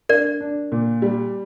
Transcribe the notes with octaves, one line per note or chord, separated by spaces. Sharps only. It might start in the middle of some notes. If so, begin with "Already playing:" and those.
D4 A#4 D5
D4
A#2
G3